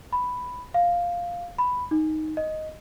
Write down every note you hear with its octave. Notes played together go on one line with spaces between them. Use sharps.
B5
F5
B5
D#4
D#5